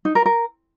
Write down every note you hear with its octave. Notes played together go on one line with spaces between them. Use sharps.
D#4
A#4
A#4